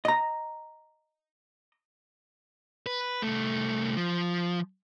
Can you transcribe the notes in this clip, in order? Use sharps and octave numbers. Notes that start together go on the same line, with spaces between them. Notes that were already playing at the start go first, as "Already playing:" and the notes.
D#5 A#5
B4
C2 A3
F3